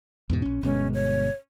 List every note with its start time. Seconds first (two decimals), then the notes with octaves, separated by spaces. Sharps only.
0.30 E2 G#2 B2
0.42 A#1 C#4
0.63 G1 B2 G#3 C#4
0.94 C#5